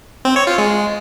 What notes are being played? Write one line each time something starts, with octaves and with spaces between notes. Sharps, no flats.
C4
C#5
F4
G#3